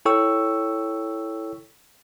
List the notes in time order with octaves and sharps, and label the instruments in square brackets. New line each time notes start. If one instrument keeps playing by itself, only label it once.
[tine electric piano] E4 A4 C#5 G5 C#6 E6